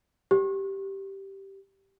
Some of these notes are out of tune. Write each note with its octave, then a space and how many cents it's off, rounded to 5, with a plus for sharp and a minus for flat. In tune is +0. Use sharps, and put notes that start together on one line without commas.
G4 -10